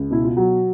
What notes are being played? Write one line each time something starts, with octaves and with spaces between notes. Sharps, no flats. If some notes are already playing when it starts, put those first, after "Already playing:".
Already playing: C#2
B2 E4
F4
F#3 F#4